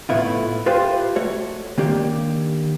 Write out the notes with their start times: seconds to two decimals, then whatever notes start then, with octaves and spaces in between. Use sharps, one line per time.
0.09 A2 A3 B3 E4 F4
0.66 F4 G4 B4 C5 F5 G5
1.16 A3 F#4 C#5
1.78 D#3 A#3 D4 G4